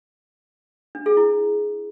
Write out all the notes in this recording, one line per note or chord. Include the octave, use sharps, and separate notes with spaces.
D4
G#4
E4